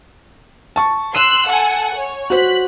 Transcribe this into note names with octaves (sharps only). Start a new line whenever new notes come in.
A5 C#6
C6 E6 F#6 D#7
A4 F#5 G#5
C#5
F#4 C5 F#6 B6